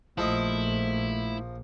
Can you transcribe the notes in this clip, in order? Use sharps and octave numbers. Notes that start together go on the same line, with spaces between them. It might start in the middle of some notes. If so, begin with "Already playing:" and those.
A#1 F3 A3 E4 A4 D#5